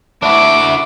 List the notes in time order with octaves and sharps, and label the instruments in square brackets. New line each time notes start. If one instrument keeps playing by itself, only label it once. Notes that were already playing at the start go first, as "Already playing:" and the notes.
[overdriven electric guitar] D4 F#4 [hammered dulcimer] E4 [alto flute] E5 [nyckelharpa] D6